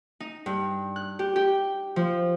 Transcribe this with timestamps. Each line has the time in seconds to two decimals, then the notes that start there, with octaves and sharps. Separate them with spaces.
0.20 D#4
0.46 G2
0.96 F#6
1.19 G4
1.36 G4
1.96 F3